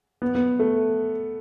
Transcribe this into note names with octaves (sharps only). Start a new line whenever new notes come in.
B3
B3
A3